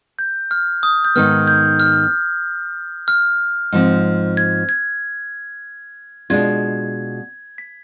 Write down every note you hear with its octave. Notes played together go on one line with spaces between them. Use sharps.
G6
F6
D#6
G6
G#2 D#3 B3 F6
G6
F6
F6
G#2 F3 C4
G#6
G#6
B2 G#3 D4 F4 G#6
B6